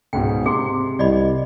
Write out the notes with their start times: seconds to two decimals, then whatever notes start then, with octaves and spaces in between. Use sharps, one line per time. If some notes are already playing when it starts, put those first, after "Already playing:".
0.13 C#2 G#2 B2 G5
0.46 C3 G#4 C6
0.99 C2 D5 D#5 B5